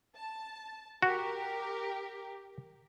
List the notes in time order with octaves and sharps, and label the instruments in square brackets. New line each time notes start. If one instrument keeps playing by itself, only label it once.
[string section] A5
[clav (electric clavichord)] F#4 [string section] G4 A#4